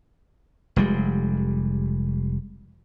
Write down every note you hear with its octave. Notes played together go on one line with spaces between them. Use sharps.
F1 G3 G#3